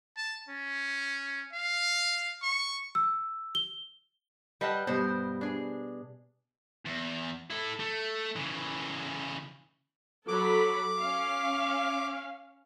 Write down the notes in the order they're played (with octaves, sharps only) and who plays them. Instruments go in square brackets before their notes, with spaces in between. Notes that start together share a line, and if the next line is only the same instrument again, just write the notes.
[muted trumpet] A5
C#4
F5
C#6
[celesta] E6
G7
[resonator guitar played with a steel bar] G3 D#5 A5 [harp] B4 F#5
[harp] G2 B2 [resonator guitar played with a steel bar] C5
[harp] D4 G#4
[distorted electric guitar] E2
E4 A4
A3
C#3 E3
[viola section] F#3 A4 B5 [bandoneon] D6
[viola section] C#4 F5